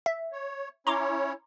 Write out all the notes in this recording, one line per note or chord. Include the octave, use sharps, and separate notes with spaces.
E5
C#5
C#4 E4 C#5 A#5 C6 D6